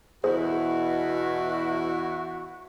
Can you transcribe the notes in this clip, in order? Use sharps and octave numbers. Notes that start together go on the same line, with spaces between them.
E2 B2 E4 F#4 G#4 C5